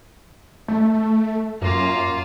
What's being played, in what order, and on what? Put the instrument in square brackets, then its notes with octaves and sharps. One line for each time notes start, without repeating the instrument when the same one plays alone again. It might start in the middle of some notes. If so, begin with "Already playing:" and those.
[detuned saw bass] A3
[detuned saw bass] F#2 [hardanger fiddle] A#3 F4